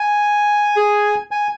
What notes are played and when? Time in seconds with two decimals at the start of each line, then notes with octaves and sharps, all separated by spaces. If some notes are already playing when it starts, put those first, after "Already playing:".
Already playing: G#5
0.76 G#4
1.31 G#5